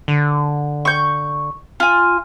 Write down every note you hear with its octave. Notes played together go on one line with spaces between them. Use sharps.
D3
C#6 G6
F4 G#5